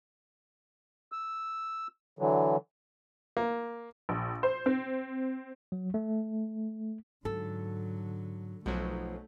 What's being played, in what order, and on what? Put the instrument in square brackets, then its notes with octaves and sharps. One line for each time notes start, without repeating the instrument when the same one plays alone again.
[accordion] E6
D3 E3 F#3
[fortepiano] A#3
[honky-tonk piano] A#1
C5
C4
[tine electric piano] F#3
A3
[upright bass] G#2 [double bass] D3 F#3 [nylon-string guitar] A4
[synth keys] B1 F#3 [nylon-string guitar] F3 [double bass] A3